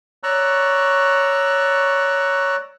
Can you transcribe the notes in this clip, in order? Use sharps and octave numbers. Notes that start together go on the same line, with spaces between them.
C#5 D5 A#5 C#6 E6 F#6